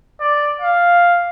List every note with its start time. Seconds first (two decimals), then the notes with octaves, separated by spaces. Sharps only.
0.20 D5
0.61 F5